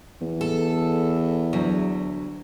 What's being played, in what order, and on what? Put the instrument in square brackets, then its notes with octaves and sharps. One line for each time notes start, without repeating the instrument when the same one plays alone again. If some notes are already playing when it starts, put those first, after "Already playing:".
[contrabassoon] E2
[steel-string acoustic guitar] A4
D2 F#3